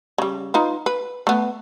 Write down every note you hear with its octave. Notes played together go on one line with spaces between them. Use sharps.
C#3 G3
D#4 F4 B4
B4
A3 B3